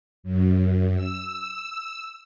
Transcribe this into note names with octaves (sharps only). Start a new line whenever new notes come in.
F#2
E6